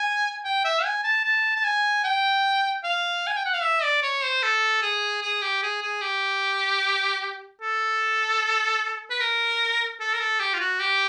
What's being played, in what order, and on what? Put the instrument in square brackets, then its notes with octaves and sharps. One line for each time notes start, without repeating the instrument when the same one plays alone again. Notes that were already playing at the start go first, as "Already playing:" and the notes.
Already playing: [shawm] G#5
G5
E5
G#5
A5
A5
A5
G#5
G5
F5
G#5
G5
F#5
F5
E5
D5
C#5
C5
A4
G#4
G#4
G4
G#4
G#4
G4
A4
B4
A#4
A4
A#4
A4
G4
F4
F#4
G4